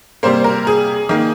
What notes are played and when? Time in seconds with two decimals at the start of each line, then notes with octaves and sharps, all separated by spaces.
0.23 C3 G3 A#3 C5
0.44 A#4
0.67 G#4
1.09 D#3 A#3